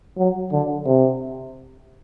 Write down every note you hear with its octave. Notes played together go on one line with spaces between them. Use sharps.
F#3
D3
C3